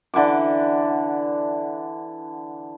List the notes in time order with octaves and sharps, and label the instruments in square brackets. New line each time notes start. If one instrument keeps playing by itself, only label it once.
[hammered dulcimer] D3 E3 F#5 D6